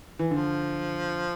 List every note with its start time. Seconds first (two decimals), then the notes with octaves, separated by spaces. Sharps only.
0.19 E3
0.30 D3 F3